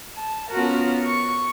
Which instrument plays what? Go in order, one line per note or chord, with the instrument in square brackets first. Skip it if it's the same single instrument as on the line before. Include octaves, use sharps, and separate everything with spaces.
[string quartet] A5
B3 C#4 F4 F#4 A#4
C#6